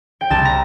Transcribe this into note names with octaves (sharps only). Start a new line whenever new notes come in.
G5
C2 A5
A#5